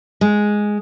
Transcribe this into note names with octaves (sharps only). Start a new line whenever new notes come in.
G#3